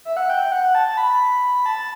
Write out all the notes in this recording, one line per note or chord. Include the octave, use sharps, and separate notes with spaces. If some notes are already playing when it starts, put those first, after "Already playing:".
E5
F#5
G5
F#5
A5
A5
B5
A5